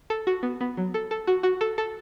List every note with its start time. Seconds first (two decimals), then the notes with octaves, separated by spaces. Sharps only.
0.10 A4
0.27 F#4
0.43 B3
0.61 B3
0.77 F#3
0.94 A4
1.11 A4
1.27 F#4
1.43 F#4
1.61 A4
1.78 A4